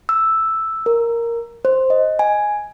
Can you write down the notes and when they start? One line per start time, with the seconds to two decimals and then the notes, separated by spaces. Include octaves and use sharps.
0.09 E6
0.86 A#4
1.65 C5
1.90 D#5
2.19 G#5